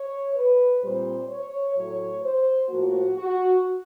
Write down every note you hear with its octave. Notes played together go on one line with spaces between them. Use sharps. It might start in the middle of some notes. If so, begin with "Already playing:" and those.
Already playing: C#5
B4
A#2 G3 C4 C5
C#5
A2 F#3 A3 C#5
C5
A2 F3 A#3 F#4
F#4